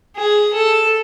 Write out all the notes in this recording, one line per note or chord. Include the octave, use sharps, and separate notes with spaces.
G#4
A4